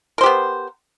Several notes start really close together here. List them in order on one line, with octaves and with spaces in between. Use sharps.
A#4 C5 G4 B3